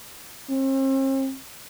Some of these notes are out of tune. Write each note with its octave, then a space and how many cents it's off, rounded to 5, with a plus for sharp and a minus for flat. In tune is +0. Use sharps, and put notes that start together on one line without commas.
C4 +45